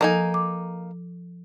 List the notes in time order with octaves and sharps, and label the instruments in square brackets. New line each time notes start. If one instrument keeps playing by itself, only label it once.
[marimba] F3 A4 [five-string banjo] A#3 D#4 G#5
[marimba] D6